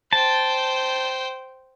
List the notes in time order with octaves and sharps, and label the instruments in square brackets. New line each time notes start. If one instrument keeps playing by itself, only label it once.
[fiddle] C5 G5 [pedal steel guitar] A5